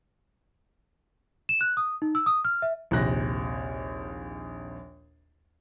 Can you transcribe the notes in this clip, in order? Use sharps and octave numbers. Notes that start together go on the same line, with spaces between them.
E7
F#6
D#6
D#4
E6
D#6
F6
E5
A#1 D#2 C3 F#6 A#6